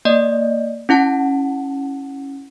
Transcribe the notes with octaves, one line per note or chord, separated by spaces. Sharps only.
A#3 D5 D#5
C#4 E4 F#5 A5